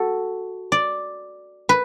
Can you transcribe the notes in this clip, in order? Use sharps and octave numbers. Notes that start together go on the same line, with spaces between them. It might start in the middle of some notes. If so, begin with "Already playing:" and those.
Already playing: F#4 A4
D5
B4